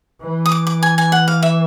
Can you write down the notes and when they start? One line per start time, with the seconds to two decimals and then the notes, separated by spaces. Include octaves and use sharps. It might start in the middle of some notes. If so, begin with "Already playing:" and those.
0.22 E3
0.46 D#6
0.52 D6
0.67 D6
0.83 G#5
0.98 G#5
1.12 F#5
1.28 F5
1.43 E5